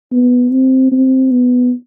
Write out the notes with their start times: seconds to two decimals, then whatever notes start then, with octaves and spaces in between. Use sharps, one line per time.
0.12 B3
0.51 C4
0.92 C4
1.31 B3